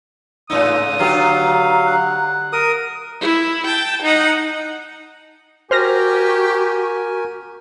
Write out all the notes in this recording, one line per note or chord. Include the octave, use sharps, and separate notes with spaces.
G#2 C#3 D#4 D#6 E6
D3 F#3 B3 G4 F5 A#5
F#5
A#4 D#6
E4
G5 A5
D#4 F#5
F#4 G4 A#4 C5 G#5 F6 A#6